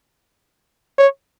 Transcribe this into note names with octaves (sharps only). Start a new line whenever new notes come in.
C#5